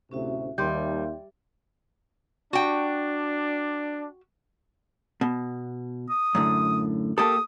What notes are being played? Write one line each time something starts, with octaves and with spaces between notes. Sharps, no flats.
D2 A2 C3 C#4 F#4 E5
D#2 G3 E5 G5 C6 G6
D4 F#4 G5
B2
D#6
F#2 A2 D3
A#3 G4 A4 D#6